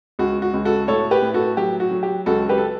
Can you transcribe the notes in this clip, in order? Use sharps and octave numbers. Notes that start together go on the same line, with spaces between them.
C#2 F#4
F#4
C#2
F#4 A4
A2 A4 C#5
G4 B4
A2
F#4 A4
F#3 G4
F#4
F#3
G4
C#2 F#4 A4
G4 B4
A4